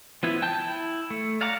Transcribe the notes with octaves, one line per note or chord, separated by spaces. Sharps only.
F3 B3 E4
G5 A5 G6
E4
A3
D5 F5 F#5 A#5 D6